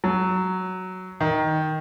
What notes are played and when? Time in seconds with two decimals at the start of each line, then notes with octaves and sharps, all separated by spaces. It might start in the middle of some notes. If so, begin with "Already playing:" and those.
0.04 F#3
1.21 D#3